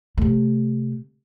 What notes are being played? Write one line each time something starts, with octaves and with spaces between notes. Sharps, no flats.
C3 A3